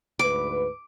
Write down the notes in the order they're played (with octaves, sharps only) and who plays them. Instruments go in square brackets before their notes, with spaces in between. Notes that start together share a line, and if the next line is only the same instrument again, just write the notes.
[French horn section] D2 G#2 B4 [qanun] D6